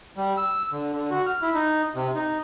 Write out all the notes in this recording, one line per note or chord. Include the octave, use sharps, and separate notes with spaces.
G3
E6
D3
D3
F#4
F6
E4
D#4
C3
D#4